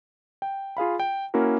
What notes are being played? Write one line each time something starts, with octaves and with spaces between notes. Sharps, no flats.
G5
F4 G#4 F5 B5
G5
A#3 C#4 E4 F#4 A#4